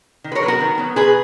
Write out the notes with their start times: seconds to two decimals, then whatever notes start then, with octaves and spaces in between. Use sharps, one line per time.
0.24 D#3
0.32 B4
0.35 A#4 C#5
0.42 F#3 B4
0.46 B3 F#4 A#4
0.61 D#3
0.78 F#3 B3
0.96 B2 G#4 B4